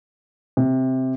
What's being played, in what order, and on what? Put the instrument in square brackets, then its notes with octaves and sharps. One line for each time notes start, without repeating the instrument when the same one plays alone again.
[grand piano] C3